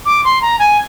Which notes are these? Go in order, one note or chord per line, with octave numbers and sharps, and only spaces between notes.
D6
C6
A#5
G#5